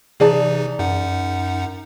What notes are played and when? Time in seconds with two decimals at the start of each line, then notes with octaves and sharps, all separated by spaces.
0.20 C3 E3 D#4 G#4 D5 A5
0.79 F#2 D#4 F#5